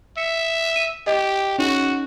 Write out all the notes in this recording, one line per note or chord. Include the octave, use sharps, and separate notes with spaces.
E5 C#7
D#7
G4 D#5
C#4 D#4 F#4 G#4